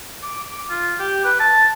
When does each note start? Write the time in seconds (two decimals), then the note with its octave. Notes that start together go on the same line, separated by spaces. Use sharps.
0.23 D6
0.44 D6
0.70 F4
0.99 G4
1.24 B4
1.40 A5